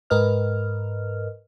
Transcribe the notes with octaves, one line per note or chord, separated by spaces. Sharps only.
G#2 A#4 B4 D#5 F6